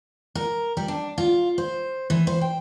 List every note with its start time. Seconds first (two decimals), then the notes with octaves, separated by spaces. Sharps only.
0.35 A#4
0.77 G3
0.88 D4
1.18 F4
1.58 C5
2.10 E3
2.27 C5
2.41 G5